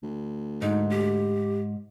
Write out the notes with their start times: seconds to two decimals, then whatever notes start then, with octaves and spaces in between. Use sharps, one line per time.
0.03 D2
0.62 G#2 D#4
0.90 G4